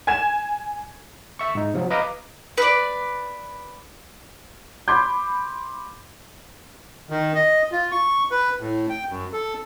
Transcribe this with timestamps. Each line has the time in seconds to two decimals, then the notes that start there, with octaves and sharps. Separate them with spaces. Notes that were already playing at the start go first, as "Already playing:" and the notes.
0.07 G#5 G#6 E7
1.39 E5 C#6
1.55 G#2 D#4
1.74 C3 F3 F#3
1.90 B4 D#5 F5 A#5 D6
2.58 B4 D5
4.88 B5 C6 D6 G6
7.10 D#3
7.35 D#5
7.72 F4
7.91 C#6
8.31 B4
8.60 A2
8.90 G5
9.09 F#2
9.33 A4